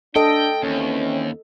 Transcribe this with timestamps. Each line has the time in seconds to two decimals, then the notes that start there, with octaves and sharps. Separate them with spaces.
0.16 D4 A4 D#5 G5
0.63 D#2 E3 C4 C#4